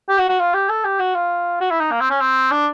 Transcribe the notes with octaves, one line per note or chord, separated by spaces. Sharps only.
G4
F#4
F#4
F4
G4
A4
G4
F#4
F4
F#4
E4
D#4
A#3
C4
C#4
C4
D4